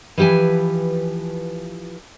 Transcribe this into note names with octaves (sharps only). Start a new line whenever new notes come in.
E3 F3 G4 B4 G#5